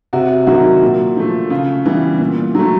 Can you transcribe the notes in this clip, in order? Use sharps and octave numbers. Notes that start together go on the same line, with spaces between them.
C3 F#4
D#3 F#3 F#4
A#2
F3 A3
C#3 F4
E3 G3 B3
A#2
F#3 A3